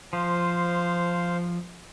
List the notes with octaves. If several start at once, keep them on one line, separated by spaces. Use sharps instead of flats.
F3 C5 F5